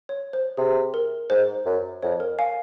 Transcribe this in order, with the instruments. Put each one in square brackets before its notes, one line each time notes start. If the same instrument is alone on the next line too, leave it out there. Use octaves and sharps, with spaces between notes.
[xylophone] C#5
C5
[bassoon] C3 [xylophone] G#4
[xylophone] A#4
[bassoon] G#2 [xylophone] C5
[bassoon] F#2
[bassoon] F2 [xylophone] C#5
[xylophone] A#4
F5 G#5